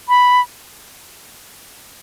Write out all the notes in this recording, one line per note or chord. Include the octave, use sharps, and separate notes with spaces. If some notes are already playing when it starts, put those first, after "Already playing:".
B5